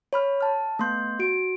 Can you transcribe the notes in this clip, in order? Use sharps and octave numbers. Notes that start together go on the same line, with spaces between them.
C#5 B5 F6
A5 F6
A3 B3 C6 G6
F#4 D7